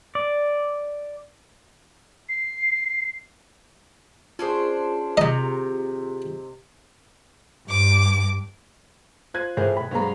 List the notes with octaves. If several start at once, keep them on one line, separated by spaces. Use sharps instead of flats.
D5
C7
C#4 D4 F4 G#4 C5
C3 D#3 D#5 A#5
G2 D6
F4 C5 F#6 G#6 D#7
A2 E3 A3 G#4 A#4 C5
B2 G5 B5
B1 G2 B2 G#3 C5 F5 A#5 B5